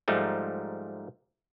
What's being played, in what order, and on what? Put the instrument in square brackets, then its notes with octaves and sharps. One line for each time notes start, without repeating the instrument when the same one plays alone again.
[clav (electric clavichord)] G#2 F3 G3 A3 D#4